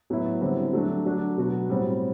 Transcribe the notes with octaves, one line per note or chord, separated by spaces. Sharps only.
A2 F#3 B3 E4
D3 G3 C4 E4
F#3 A3 D4 F#4
F#3 A3 D4 F#4
B2 F#3 B3 F#4
A2 G3 C4